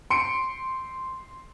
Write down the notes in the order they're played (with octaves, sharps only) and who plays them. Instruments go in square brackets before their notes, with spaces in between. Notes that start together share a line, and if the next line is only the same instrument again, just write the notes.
[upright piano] C6 C#7 D7